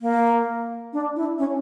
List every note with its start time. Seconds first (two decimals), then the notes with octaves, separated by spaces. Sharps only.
0.01 A#3
0.93 D4
1.16 E4
1.38 C#4